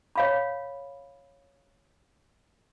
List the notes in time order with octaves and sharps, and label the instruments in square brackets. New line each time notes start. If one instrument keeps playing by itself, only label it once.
[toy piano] C#5 F5 B5